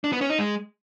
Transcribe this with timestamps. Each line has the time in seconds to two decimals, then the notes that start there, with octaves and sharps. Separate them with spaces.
0.04 D4
0.12 B3
0.21 C#4
0.30 D#4
0.38 G#3